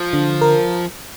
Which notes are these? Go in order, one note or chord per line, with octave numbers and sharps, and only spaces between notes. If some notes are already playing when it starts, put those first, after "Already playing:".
Already playing: F3
D3
A#4